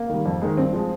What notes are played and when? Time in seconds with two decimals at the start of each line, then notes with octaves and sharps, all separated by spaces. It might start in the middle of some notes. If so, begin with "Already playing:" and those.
Already playing: A#3
0.09 D#3 G3
0.26 F2
0.42 D#3 G#3
0.57 G2 C4
0.73 F3 G#3